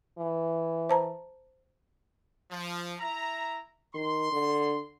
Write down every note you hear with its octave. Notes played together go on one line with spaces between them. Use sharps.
E3
C5 A5 A#5
F3
E4 E5 A#5
D#3 C6
D3